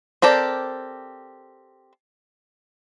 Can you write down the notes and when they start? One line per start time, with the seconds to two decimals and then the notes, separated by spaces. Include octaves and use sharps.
0.22 C4 G4 A4 A#4 D5